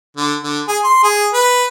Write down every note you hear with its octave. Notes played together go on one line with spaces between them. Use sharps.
D3
D3
G#4
C6
G#4
B4